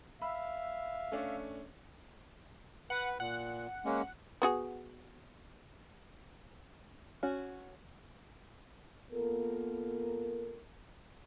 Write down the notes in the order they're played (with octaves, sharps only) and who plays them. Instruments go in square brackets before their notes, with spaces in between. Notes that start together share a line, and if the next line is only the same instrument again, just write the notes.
[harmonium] E5 F5 [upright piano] B5 E6
[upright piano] A3 C#4 D4
[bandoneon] B4 [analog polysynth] F#5
[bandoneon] A#2 [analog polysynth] F#5
[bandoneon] G#3 A#3 C#4
[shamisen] B3 F#4 G#4
[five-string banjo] C#4 F#4
[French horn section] A#3 B3 F4 A4 A#4